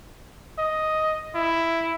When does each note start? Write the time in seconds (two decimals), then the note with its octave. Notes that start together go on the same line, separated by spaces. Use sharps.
0.59 D#5
1.35 E4